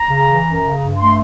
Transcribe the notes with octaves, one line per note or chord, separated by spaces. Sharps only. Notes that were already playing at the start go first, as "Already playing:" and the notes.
Already playing: A#5
C#3
E3
F#2
C#3
G2
A3 C6